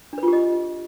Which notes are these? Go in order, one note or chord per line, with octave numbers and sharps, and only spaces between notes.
D4 F4 G4 B4 D#5